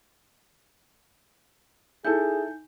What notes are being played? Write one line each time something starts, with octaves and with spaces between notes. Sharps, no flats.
D#4 E4 G#4 A4 G#5 G6